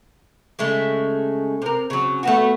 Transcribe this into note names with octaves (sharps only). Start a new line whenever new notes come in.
C#3 G#3 A3
C3 A#4
C#3 F#3
A3 B3 F#4